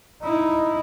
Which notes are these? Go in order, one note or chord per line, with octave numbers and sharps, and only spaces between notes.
D#4 E4